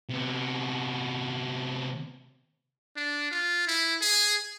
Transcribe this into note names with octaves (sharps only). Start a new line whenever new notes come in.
C3 B3
D4
F4
E4
G#4